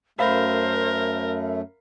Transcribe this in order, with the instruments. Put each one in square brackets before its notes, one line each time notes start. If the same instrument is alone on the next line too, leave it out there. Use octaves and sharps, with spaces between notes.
[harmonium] F#2 A3 [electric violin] A#4 [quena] C5 [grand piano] E5 F5 B5